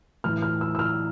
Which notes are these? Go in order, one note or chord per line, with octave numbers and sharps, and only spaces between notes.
A2 E3 F6
F6
E6
E6
F6